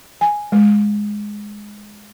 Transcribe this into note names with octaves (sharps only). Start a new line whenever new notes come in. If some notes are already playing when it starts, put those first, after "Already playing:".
G#5
G#3